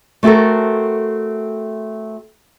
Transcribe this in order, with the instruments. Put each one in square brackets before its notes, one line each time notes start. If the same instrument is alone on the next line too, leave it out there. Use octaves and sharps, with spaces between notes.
[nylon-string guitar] A3 C4 F#4 A4 A#4